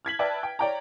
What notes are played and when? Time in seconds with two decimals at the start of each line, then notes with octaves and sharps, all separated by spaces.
0.05 F6 G#6 B6 F#7
0.19 B4 D5 E5 G5 A5
0.43 G5
0.59 C#5 D5 G5 A#5